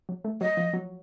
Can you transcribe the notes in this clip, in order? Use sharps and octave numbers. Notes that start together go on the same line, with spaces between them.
F#3
A3
F#3 D#5
F3
F#3